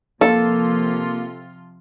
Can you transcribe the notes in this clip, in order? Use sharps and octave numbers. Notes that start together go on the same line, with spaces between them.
C3 F3 A#3 F4 A4